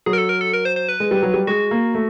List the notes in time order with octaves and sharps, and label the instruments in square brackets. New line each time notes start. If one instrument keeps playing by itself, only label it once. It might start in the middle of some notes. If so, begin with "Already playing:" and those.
[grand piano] F#3 [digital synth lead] G#4
[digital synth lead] A#4
A4
A#4
A4
A#4
C5
C5
B4
[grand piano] G#3
G3
F#3
G3
[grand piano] G#3 [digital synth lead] F#4
[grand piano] A#3
A3